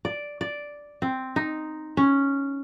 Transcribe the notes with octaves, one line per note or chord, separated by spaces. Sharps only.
D5
D5
C4
D#4
C#4